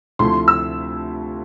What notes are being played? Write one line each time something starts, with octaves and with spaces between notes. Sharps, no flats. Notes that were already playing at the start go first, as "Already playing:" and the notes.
D2 C3 F3 A3 E4 C6
E6